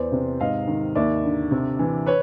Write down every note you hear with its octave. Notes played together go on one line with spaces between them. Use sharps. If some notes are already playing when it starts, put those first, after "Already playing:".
Already playing: E2 C5 D5
C3
G#2 D#5 F5
D#3
D#2 D5 E5
D3
C3
E3
B4 C#5